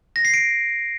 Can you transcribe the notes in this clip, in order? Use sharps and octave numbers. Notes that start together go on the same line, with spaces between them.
A#6
C7
D7